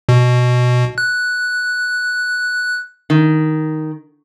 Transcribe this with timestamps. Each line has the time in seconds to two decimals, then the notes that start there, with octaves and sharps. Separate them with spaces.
0.09 B2
0.98 F#6
3.10 D#3